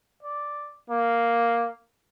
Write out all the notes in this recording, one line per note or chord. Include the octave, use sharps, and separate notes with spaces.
D5
A#3